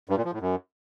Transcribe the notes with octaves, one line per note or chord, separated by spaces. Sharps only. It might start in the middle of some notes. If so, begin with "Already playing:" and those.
G2
A#2
F3
A2
F#2